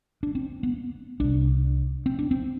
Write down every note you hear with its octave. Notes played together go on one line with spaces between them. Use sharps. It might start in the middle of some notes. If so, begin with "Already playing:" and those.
D4
C4
B3
C2 C3 D4
C4
D4
C4